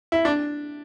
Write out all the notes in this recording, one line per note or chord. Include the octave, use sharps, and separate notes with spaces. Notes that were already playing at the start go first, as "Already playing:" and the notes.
E4
D4